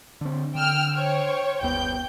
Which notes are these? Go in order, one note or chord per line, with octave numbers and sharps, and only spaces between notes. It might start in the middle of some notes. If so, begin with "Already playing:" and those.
D3 C4
D3 G5 E6 F6
C5 C#5 G5
G1 D#2 B3 G5 G6